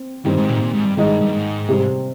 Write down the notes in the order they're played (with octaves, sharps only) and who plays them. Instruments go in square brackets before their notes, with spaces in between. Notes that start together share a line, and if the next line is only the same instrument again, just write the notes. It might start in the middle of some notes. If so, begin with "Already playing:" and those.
Already playing: [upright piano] C4
[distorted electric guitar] G2 [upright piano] D#3 G3 C4
[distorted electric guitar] G#2
A#2
G#2
A#2
G#2
G2
[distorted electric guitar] G#2 [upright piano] D#3 G#3 D#4
[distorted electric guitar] G2
G2
G#2
[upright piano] C3 G3 C4